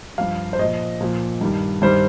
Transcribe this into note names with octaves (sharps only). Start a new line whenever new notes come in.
G2 F3 F5
C5
A#2 F3 D#5
A#2 F3
G2 D#3 G3
G2 D#3 G3 C5